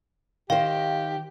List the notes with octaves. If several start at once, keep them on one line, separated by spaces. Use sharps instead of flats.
D#3 G4 C5 F5